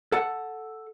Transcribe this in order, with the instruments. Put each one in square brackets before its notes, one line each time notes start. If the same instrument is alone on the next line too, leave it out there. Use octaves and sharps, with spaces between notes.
[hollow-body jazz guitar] A4 F#5